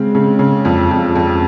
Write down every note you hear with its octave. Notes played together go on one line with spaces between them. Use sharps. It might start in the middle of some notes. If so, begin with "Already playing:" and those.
Already playing: C#3 G#3 C4
C#3
C#3
F2
F2
F2